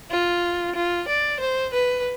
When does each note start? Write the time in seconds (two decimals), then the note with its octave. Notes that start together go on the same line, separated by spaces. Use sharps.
0.11 F4
0.75 F4
1.08 D5
1.40 C5
1.73 B4